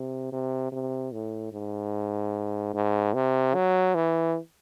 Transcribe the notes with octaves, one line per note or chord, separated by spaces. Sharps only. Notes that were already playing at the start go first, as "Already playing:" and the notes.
Already playing: C3
C3
C3
A2
G#2
G#2
C3
F#3
E3